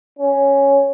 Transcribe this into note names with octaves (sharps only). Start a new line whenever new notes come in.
C#4